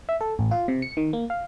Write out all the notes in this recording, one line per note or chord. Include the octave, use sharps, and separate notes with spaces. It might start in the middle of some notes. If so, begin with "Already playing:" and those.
E5
A4
A1
F4
C3
C#7
D#3
A#3
F5